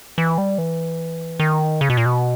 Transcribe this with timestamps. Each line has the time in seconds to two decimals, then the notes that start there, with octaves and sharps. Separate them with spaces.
0.18 E3
0.38 G3
0.58 E3
1.40 D#3
1.81 C#3
1.90 B2
1.97 A#2
2.06 B2